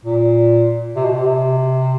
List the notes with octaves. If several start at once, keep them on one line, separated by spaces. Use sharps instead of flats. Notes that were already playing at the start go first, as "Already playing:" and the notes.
A#2
C3
B2
C3